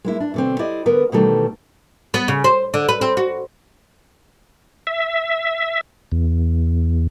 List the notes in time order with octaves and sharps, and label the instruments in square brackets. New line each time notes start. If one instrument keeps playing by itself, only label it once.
[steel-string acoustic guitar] G#3 A#3 E4
D4
B2 D3 C4
E4 G4 C5 D5 D#5
D3 B3 A#4 B4
B2 D#3 E3 G3 A3 A4
[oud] B3
C#3
C5
D3
B4
C4
F#4
[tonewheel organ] E5
E2